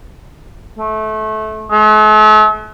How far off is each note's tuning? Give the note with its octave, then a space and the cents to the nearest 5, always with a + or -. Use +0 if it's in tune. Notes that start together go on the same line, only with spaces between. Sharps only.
A3 -20
A3 -45